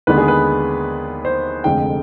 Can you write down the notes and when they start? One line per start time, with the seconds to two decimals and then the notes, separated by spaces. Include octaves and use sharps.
0.07 D#2 D3 G#3 B3 B4
0.18 G#4
0.28 B4
1.25 C5
1.64 F1 F2 D3 G#3 G5